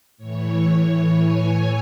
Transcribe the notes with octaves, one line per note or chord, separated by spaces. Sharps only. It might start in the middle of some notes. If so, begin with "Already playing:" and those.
A2 E3 C#5
G#5